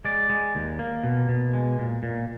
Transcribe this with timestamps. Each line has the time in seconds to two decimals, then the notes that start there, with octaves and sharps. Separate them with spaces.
0.05 G#3 D5
0.29 G#3
0.55 D#2
0.79 A#3
1.04 B2
1.29 B2
1.53 G#3
1.79 A#2
2.03 A#2